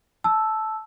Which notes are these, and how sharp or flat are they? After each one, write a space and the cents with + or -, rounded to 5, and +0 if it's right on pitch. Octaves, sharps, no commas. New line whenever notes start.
A5 -10 E6 +0